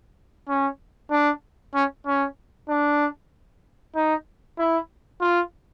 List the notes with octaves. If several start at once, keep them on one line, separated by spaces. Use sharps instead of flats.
C#4
D4
C#4
C#4
D4
D#4
E4
F4